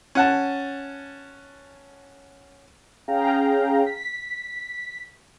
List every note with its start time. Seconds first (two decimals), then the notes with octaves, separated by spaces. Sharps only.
0.15 C#4 F#5 A5
3.08 C#4 G#4 F5 G5 A#5
3.86 B6